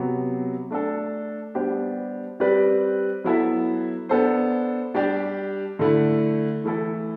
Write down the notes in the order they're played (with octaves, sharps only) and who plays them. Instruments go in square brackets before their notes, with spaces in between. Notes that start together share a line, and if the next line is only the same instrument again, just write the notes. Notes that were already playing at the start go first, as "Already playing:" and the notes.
Already playing: [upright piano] C3 F#3 B3
A3 D4 A4
G3 B3 D4 G4 C5
G3 C4 G4 B4 D5
F#3 B3 E4 A4 E5
B3 D4 A4 C5
G3 D4 G4 D5
D3 A3 E4
E3 A3 E4 A4